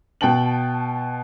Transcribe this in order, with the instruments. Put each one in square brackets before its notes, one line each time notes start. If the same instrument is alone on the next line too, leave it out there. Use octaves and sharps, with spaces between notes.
[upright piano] B2 G5 A5 F#7